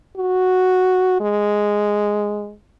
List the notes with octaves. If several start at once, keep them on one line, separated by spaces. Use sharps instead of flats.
F#4
G#3